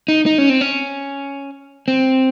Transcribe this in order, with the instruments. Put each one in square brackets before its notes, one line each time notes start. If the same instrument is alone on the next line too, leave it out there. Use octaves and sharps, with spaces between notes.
[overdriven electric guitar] D#4
D#4
C#4
C4
C#4
C4